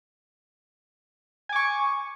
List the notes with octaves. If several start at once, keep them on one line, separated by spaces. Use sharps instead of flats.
G#5 C#6 D6